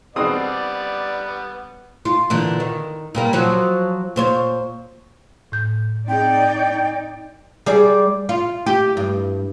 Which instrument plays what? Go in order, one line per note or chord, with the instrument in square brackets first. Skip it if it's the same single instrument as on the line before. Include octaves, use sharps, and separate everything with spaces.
[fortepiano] B2 C4 D#6 [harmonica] G3 B3 [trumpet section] D5
[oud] F4
A#2 D3 E3
D#3
A#2 G3 A#3
F3 F#3 F#4
A#2 C5 C#5
[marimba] A2 G6
[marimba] C4 G#4 [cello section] D#4 D5 [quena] G5
[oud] G3 G#4 D5
F4
G4
G2